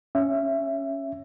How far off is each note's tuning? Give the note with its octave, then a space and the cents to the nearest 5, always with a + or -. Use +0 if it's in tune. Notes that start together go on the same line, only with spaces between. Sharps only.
C#4 +0 E5 +15